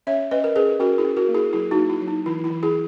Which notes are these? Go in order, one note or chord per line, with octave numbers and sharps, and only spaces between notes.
C#4 C#5 E5
C#4 B4 D#5
A#4
C#4 G#4 B4
C#4 F#4 A#4
E4 G#4
C#4
F#4 A#4
A#3
E4 G#4
F#3 E4 G#4
D#4 F#4
A#3
E4
F#3
D#4
E3 E4
E4
E3
E4 G#4